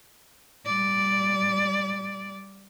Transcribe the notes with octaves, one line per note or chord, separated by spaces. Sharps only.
G3 D5